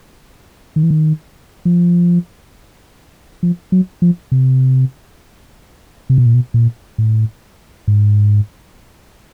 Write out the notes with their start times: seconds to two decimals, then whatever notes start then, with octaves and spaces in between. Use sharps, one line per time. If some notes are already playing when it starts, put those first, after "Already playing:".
0.76 D#3
0.83 E3
0.91 D#3
1.65 F3
3.43 F3
3.72 F#3
4.02 F3
4.32 C3
6.10 C3
6.18 B2
6.26 A#2
6.34 B2
6.54 A#2
6.98 A2
7.88 G#2